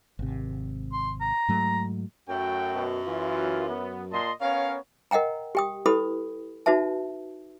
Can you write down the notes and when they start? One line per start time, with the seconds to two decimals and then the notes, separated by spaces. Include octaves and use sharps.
0.19 G#1 C3
0.92 C6
1.21 A#5
1.49 G#2 F#3 A3
2.29 F#2 A3 F#4 G5
2.74 B2
3.06 E3 F4
3.69 B3
4.12 A#2 D#5 A5 C6
4.41 B3 C#4 A#4 C#5 F5
5.11 A#4 D#5 F#5 G5 A#5
5.55 G4 G5 D#6
5.86 E4 G4 A4 B4 B5 D#6
6.66 D#4 F#4 B4 E5 A5